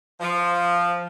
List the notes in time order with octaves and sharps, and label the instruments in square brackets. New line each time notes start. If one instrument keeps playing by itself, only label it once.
[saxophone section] F3